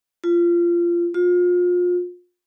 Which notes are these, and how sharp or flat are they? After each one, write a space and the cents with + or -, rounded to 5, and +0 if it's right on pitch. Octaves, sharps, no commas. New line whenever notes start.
F4 -20
F4 +30